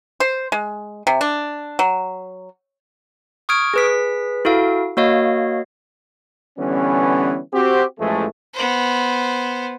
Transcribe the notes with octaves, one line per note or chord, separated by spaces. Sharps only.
C5
G#3
C3
D4
F#3
C#6 D#6 F6 G#6 D7
G#4 B4 B6
E4 F#4 A4 F5
A#3 F#4 C#5 D#5 F5
D3 E3 G3 B3 C#4
C4 F#4 G4
A1 E3 F3 G#3 A3
B3 C5